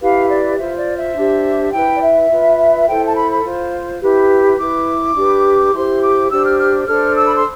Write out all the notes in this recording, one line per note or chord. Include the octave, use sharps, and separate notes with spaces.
E4 G4 B4 F5
D5
F4 C5 E5
D5
E5
D4 G4 C5
E4 B4 G5
D5
E5
F4 B4
E4 A4 C5 G5
A5
B5
B5
F4 C5
E4 G4 B4
E4 B4 D6
D4 G4 B4
E4 G4 C5 C6
D6
D4 G4 C5 E6
F6
F6
D4 A4 C5 F6
E6
B5
C6